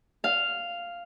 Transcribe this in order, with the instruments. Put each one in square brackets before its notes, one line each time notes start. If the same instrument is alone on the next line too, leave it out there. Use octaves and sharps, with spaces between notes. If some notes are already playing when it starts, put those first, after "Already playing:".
[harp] F5